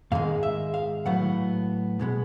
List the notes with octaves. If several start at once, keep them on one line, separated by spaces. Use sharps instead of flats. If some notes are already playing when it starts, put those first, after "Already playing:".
G#2 D#3 G#3 F5
E5
F5
A2 F#3 B3 F#5
B2 G#3 B3